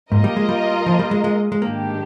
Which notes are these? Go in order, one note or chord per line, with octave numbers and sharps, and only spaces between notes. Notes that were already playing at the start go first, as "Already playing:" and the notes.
G#2 A#3 F4 A#4 D#5
G3
G#3
G3
F3
G3
G#3
G#3
G#3
G#2 D#3 G3 A#3 D4 G4